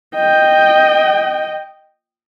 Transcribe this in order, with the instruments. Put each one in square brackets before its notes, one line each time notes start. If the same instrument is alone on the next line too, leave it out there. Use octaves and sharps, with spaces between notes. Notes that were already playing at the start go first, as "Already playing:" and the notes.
[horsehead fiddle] D#5 G5